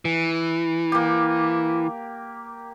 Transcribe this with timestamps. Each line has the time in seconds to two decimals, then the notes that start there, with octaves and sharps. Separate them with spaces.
0.05 E3
0.92 A#3 G4